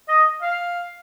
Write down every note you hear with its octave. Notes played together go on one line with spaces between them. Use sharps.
D#5
F5